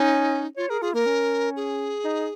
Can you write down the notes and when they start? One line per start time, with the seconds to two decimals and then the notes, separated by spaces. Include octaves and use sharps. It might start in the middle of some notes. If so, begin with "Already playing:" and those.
Already playing: C#4 D#4
0.57 F4 C#5
0.69 G#4 A#4
0.81 F4 G#4
0.94 A#3 A#4
1.06 C#4
1.56 G#4
2.04 D#4